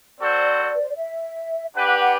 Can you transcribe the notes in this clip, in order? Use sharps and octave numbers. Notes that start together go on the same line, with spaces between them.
C4 F#4 A4 C5 D5
B4
C5
D5
E5
D4 G4 B4 F#5
F#5
F#5